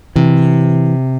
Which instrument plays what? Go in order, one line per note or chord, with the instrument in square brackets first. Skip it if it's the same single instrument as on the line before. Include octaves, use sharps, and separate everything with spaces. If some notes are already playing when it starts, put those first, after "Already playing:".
[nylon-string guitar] C3 [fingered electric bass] E3